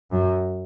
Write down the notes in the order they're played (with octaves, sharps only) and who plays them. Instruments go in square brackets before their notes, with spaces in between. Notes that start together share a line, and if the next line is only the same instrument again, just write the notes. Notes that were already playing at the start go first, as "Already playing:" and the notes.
[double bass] F#2